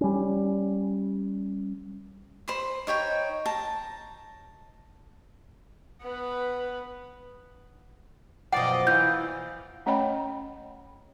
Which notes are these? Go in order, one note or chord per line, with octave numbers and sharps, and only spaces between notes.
G3 C#4
C5 B5 C6
D#4 C#5 G5 B5
A5 A#5
B3 B4
F#2 B2 F3 D5 D#5 F#5
E3 F4 G6
A3 C#4 C#5 D#5 G5 B5